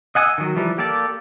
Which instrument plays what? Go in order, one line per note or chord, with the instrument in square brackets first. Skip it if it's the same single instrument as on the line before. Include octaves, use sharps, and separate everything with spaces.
[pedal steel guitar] D#5 F#5 G#5 D#6 E6
D#3 F#3
E3 F3 G3
A#3 G4 A4 D5